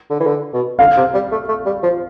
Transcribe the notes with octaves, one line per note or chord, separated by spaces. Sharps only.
D3
E3
D3
B2
D3 F5
C3
G3
A3
A3
G3
F3